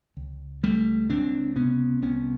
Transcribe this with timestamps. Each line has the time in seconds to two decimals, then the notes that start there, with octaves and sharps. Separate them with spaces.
0.17 C#2
0.63 C#2 G3 A3
1.09 C#2 C4 D4
1.56 C3 B3 C#4
2.02 C2 B3 C#4